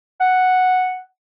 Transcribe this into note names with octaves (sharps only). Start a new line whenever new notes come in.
F#5